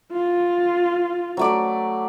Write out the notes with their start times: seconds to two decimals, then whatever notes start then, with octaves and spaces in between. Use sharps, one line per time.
0.12 F4
1.37 F#3 A3 D5